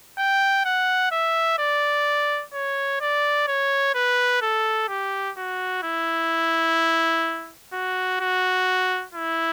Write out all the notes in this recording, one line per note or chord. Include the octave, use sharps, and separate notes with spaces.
G5
F#5
E5
D5
C#5
D5
C#5
B4
A4
G4
F#4
E4
F#4
F#4
E4